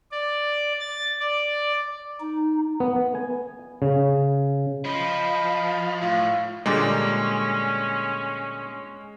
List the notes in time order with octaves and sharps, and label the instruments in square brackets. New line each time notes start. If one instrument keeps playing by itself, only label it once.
[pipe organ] D5
A6
D5
D#4
[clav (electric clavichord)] B3
G#5
C#3
[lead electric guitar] F3 [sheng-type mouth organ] D#5 B5
[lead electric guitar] A2 [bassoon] F4
[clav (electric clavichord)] A#2 D3 G3 [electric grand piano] G#3 [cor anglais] C#4